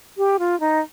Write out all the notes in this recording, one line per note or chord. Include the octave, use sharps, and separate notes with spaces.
G4
F4
D#4